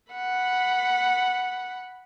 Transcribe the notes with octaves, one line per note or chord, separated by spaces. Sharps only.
F#5 B5